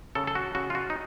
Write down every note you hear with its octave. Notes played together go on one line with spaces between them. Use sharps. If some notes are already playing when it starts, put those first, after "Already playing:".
C#3 A4
A4
F#4
C#3 F#4
F4
F#4
D#4